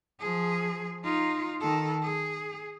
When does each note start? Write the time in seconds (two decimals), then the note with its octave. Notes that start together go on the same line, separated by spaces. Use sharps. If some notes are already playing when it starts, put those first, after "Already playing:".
0.20 F3 G#4
1.04 D#4 F4
1.61 D#3 A4
2.02 G#4